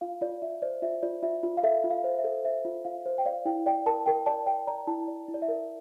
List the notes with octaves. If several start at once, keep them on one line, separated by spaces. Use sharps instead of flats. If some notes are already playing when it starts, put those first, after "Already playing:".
F4 F5
F4 D5
F4 E5
C5 D5
F4 E5
F4 D5
F4 E5
F4
F5
A4 E5
F4
F5
C5
E5
A4
C5 E5
F4
F4 F5
C5
G5
D5 F5
E4 G5
D5 G5
A#4 A5
A#4 G5
D5 A5
D5 G5
D5 A#5
E4 A5
D5
E4
D5
E5
A#4